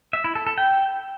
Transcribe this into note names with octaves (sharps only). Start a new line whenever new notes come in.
E5
E4
A4
A4
G5